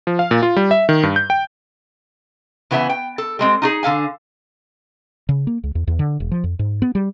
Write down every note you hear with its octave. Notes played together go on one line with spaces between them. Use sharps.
F3
F5
A#2
F4
G3
E5
D#3
G2
G6
G5
C#3 E3 B3 F#4 E5 G#5
G5
A4
G3 G#3 C4
D#4 F4 G#4
D3 A4 F5 G#5
C#3
A#3
C#2
E2
E2
D3
E1
F3
F2
G#2
B3
G3